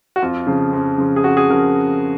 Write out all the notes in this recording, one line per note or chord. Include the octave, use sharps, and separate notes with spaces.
F#4
F2 F4
C#3 F3
F2
C#3 F3
G#4
F2 F#4
G#4
C#3 F3 A#4